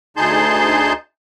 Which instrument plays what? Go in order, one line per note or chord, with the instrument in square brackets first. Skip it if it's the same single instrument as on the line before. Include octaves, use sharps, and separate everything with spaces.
[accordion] D2 D#4 G#4 A5 C6 G6